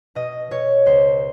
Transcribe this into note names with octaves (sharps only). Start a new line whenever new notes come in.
B2 D#5
B2 C#5
C#2 C5